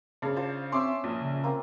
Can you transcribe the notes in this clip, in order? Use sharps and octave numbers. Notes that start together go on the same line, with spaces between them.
C#3 D4 C5
F4 C5 A5
C4 C#4 E5 C6 D6 E6
A#1 D#6
C#3
A#3 C4 F4